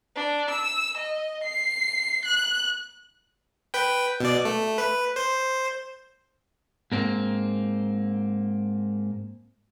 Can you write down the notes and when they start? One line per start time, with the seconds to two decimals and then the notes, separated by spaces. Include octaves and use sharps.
0.16 D4
0.50 E6
0.97 D#5
1.43 C7
2.25 F#6
3.74 B4 G5
4.20 B2 D5
4.45 A3
4.78 B4
5.16 C5
6.92 G#2 A#3 C4